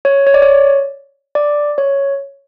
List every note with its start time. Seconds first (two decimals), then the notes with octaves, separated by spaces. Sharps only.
0.05 C#5
0.27 C#5
0.34 D5
0.42 C#5
1.35 D5
1.78 C#5